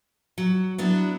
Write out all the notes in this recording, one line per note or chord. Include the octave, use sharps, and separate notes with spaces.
F#3
F#3 B3 D4 E4